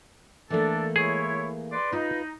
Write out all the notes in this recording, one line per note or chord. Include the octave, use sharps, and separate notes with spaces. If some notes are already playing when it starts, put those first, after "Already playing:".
E3 A3 A#3 D4 A4 D5
G#3 E4 G#4 C#5
B4 D5 C6
D#4 F4 B4